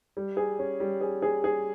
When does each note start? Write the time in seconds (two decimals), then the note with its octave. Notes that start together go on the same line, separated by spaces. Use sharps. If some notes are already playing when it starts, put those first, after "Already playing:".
0.17 G3
0.37 G#4
0.59 C#4
0.80 G3
1.01 G#4
1.22 G#4
1.44 G#4